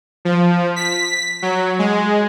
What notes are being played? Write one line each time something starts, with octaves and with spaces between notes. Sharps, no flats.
F3
B6
F#3
G#3